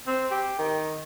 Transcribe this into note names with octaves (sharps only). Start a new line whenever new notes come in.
C4
G4
D#3